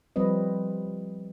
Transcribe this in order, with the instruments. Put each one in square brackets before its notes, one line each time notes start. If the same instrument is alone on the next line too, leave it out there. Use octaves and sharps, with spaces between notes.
[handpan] F3 G3 C4 B4 D#5